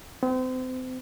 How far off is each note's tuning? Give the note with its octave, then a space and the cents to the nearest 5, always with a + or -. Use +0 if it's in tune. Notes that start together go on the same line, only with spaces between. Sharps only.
C4 -35